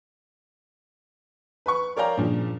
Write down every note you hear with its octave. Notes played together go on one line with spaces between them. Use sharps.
B4 B5 C#6
A#4 C#5 D5 F5 G5 A#5
G2 A#2 C#3 F3